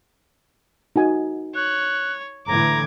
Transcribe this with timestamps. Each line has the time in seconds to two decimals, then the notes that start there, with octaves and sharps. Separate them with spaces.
0.96 D#4 F#4 G#5
1.55 C#5 F#6
2.47 A2 D3 E3 A#5 D6 G#6